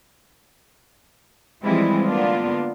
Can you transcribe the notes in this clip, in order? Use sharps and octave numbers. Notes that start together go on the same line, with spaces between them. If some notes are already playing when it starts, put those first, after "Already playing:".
E3 F3 G3 G#3 C4 E4
D3 A#3 B3 D4 F4